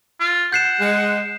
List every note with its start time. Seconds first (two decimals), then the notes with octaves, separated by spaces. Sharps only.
0.20 F4
0.52 F#5 G6 C7 E7
0.80 G#3